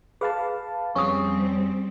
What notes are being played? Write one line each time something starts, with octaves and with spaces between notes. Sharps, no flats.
G#4 B4 F5 A5
F2 G3 C4 C#4 G#4 C#6 D#6